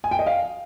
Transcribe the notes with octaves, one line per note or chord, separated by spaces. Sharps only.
G#5
G5
D#5
F5